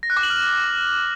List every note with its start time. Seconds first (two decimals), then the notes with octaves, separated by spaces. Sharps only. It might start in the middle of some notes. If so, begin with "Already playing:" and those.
0.03 A#6
0.10 F#6
0.17 D6
0.23 F#7
0.30 F6